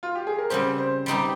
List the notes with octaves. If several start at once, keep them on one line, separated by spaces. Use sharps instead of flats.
F4
G4
G#4
A#4
C#3 G3 C4 G4 C5
C5
G3 C4 D#4 G4